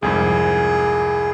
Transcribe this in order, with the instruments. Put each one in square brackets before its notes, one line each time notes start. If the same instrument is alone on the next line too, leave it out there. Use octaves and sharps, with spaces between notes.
[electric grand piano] C2 F2 G#2 [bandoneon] G#4